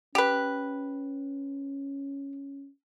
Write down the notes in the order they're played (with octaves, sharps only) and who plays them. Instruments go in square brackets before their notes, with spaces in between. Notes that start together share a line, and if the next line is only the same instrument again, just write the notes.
[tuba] C#4 [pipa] G4 B4